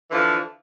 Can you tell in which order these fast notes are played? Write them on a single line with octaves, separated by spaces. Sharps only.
E3 D3 F3